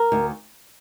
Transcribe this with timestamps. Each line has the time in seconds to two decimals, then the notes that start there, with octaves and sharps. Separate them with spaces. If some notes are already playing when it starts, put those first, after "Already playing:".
Already playing: A#4
0.12 D2